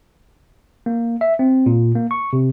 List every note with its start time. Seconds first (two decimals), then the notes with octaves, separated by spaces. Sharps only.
0.86 A#3
1.21 E5
1.39 C4
1.66 A#2
1.95 A#3
2.11 C#6
2.33 C3